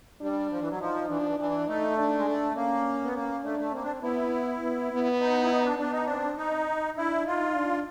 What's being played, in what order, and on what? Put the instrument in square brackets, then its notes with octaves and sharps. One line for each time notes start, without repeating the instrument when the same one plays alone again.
[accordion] G3 [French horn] D4
[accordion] F3
E3
F#3
[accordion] F3 [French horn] D#4
[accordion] E3 [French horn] D4
[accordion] F3
E3
[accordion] E3 [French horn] D4
[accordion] A3 [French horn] D#4
[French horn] D4
[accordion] G#3
A3
[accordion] A#3 [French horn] C#4
[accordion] B3
[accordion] A#3 [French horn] C#4
[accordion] A3 [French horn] D4
[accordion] A3
[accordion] A#3 [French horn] C4
[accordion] D4
[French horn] B3 [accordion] E4
[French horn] B3
B3
[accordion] D#4
E4
D#4
D4
[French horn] B3 [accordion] D4
[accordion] D#4
[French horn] C4 [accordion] D4
[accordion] D#4
[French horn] D4 [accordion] E4
[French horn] D#4 [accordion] F4
[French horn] D4